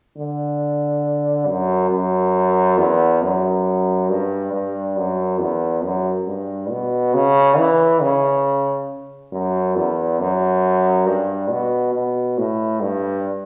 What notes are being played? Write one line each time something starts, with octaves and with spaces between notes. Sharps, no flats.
D3
F#2
F#2
E2
F#2
G2
G2
F#2
E2
F#2
G2
B2
C#3
E3
C#3
F#2
E2
F#2
G2
B2
B2
A2
G2